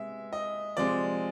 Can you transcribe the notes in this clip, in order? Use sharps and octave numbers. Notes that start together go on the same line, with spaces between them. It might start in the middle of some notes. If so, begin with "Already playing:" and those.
Already playing: C3 G#3 B3 E5
D#5
C3 F3 G#3 C4 D5